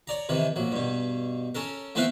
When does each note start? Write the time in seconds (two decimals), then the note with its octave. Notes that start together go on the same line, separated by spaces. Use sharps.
0.07 C#5 D5 A#5
0.29 C3 D#3 E3
0.56 A#1 F#3
0.72 G2 B2
1.55 C#4 A4 A#4
1.95 A3 B3 C4 E4 B4 F5